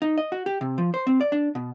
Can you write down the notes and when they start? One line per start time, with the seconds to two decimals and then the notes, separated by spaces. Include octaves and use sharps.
0.02 D#4
0.18 D#5
0.32 F#4
0.46 G4
0.61 C3
0.78 F3
0.94 C5
1.07 C4
1.21 D5
1.32 D4
1.55 B2